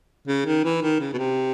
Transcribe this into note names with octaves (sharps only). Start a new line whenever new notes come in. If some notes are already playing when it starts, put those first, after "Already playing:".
C#3
D#3
E3
D#3
C#3
B2
C3